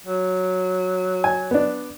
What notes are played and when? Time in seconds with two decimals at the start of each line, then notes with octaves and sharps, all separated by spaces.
0.07 F#3
1.24 G#5
1.51 B3 D4